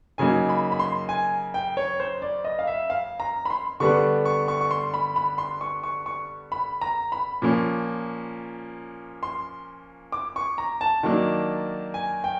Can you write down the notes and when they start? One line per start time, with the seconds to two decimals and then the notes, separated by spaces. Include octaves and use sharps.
0.18 C#3 F#3 A#3 D#4 G#5
0.49 B5
0.72 B5
0.79 C6
1.09 G#5
1.54 G5
1.77 C#5
2.00 C5
2.22 D5
2.45 D#5
2.59 F5
2.67 E5
2.90 F5
3.20 A#5
3.45 B5
3.50 C6
3.80 D3 G3 B3 D4 C#6
4.25 C#6
4.48 C#6
4.61 C#6
4.71 C6
4.94 B5
5.16 B5
5.38 C6
5.61 C#6
5.83 C#6
6.06 C#6
6.52 B5
6.81 A#5
7.12 B5
7.42 A#2 F3 A#3 C#4
9.23 C6
10.12 D6
10.36 C#6
10.58 A#5
10.81 A5
11.03 D#3 F#3 A#3 D4
11.94 G#5
12.24 G5